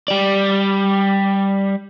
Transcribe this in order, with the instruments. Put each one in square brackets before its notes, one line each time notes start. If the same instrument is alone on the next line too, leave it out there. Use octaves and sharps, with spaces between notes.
[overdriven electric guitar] G3 D5